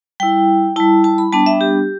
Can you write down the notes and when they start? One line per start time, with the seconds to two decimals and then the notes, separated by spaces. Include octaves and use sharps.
0.20 G3 E4 G5
0.76 G3 E4 A5
1.04 A5
1.18 B5
1.32 G3 B3 D4 A5
1.46 E5
1.61 G4